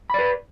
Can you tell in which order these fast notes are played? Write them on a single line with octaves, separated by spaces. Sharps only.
B5 D5 B4